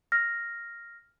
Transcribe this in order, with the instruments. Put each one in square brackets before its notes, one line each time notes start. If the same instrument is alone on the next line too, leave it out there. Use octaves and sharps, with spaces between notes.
[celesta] F6 A#6